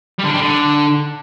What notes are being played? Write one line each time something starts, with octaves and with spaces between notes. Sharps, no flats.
G3
D3
D4
G3
D3